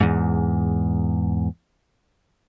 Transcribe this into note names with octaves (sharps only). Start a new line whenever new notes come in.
E2 G#2